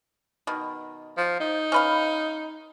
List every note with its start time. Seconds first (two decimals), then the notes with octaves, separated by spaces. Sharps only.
0.47 B2 D#3
1.18 F3
1.40 D#4
1.72 C#4 B4 F5